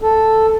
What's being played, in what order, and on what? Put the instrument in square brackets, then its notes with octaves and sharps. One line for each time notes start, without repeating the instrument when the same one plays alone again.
[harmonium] A4